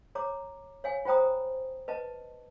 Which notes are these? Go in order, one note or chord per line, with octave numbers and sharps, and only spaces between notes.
C#5 A#5 D6
C#5 F5 G#5
F4 C5 G5 A#5 D#6
B4 D#5 A5